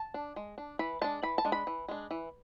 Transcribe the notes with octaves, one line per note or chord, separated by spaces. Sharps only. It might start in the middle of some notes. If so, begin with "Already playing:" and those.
Already playing: A5
D4
G#3
D4
E3 B5
G#3 D4 A5
E3 B5
A5
G#3 D4
B5
E3
G#3 D4
E3